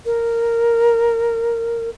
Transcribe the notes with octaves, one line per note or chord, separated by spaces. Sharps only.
A#4